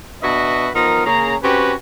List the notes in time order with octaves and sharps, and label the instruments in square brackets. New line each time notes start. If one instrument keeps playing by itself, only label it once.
[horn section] B2 D4 F#4 B4 D#5 E5
F3 B3 D#4 A#4
C#3 A#3 C#4 G#4 A#5
C4 C#4 F#4 G4 B4